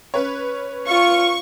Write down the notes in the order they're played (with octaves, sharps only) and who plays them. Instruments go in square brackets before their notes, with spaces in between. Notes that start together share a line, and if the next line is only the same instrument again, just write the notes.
[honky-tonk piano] C#4 B4 C#5
[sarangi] F4 [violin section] C#6